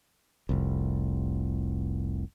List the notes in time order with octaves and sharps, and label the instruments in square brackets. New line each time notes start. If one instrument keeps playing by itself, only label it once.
[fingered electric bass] F1 C2